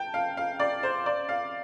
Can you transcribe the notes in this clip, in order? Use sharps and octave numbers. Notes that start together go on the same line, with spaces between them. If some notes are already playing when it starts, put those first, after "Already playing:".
Already playing: G5 A5
F5
F5
D5
C5
D5
F5